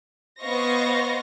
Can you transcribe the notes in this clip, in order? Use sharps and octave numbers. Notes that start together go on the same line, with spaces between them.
B3 C5 D#5 F5 C#6 A#6